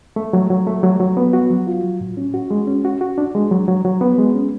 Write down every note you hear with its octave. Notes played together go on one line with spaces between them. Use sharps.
A3
F#3
F#3
A3
F#3
F#3
B3
F#4
F#3
F4
F#3
A2
C#4
F#4
G#3
C#4
F#4
F#4
D4
G#3
F#3
F#3
F#3
B3
G#3
C#4